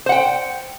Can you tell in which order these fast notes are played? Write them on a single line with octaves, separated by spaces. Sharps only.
C5 F#5 G5